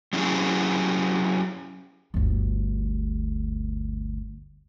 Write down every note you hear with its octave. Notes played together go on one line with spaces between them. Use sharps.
F#3 C#4 E4 G4 G#4
G1 D2